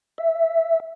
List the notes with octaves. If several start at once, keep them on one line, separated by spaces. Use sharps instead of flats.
E5